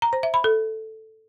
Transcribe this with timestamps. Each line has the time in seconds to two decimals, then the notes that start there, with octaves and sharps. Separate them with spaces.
0.02 A#5
0.13 C5
0.23 E5
0.34 B5
0.44 A4